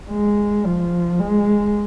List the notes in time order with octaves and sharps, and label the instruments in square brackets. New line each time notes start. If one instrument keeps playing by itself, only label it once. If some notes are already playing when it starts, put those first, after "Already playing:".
[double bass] G#3
F3
G#3